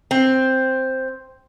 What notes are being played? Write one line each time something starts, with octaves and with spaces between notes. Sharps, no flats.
C4